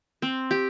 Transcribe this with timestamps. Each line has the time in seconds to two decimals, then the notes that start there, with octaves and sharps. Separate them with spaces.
0.22 C4
0.51 G4